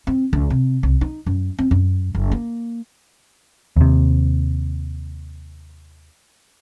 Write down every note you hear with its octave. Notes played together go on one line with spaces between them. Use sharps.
C4
C#2
C3
C2
D#4
F#2
C4
F#2
F#1
A#3
D#2 C3